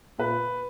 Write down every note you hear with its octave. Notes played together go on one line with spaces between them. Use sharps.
A#2 B4